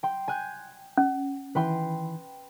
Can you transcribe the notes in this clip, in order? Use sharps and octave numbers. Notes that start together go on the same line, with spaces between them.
G5 C6
G#5 F#6 G6
C#4
D#3 E3 B4 G5 C6